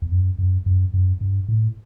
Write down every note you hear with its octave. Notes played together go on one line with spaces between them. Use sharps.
E2
F#2
F#2
F#2
F#2
G2
A2